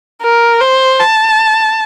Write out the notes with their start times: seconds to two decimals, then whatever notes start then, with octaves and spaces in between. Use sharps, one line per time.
0.22 A#4
0.61 C5
1.00 A5